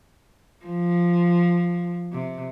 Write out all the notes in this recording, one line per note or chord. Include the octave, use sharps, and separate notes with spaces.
F3
C3